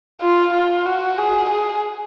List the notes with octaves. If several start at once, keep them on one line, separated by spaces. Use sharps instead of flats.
F4
F4
F#4
G#4
G#4